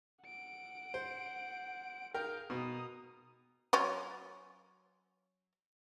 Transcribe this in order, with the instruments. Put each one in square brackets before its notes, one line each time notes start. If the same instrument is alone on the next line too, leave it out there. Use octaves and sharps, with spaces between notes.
[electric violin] F#5 D7
[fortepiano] C5
[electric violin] G#4 F5 [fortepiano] A#4 G5
[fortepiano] B2 [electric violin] A#5 D#6
[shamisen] F#3 C#4 F4